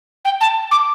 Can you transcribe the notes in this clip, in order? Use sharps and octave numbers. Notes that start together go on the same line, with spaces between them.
G5
A5
D6